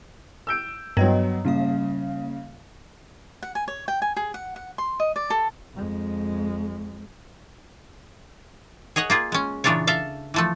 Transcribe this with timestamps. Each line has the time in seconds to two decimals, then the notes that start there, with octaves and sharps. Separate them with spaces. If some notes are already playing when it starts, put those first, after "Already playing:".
0.47 E6 G6 D7
0.97 G2 F#3 B3 C#5 D#5 A#5
1.45 C#3 G3 A#3 F5
3.43 F#5
3.55 G#5
3.68 C#5
3.88 G5
4.02 G#5
4.17 G#4
4.34 F#5
4.56 F#5
4.78 C6
5.00 D#5
5.16 D5
5.30 A4
5.75 F2 G#3
8.96 G#4 C#5 D#5 F#5
9.10 A#3 F4 G#4
9.32 G#3 C#4
9.64 A#2 C#3 E3 D4 F4 C#5
9.87 A4 E5 F5
10.34 E3 F3 A3